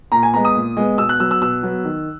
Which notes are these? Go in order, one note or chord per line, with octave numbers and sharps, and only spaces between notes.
A#2 A#5
G#5
G#3 B3 A#5
D#6
A#2
G#3 B3
B2 E6
F#6
F#3 B3 E6
E6
B2 E6
F#3 B3
D#3